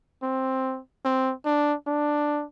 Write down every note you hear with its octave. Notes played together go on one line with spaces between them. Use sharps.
C4
C4
D4
D4